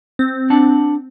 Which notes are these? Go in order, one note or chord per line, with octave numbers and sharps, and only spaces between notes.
C4
D4 F#5 A5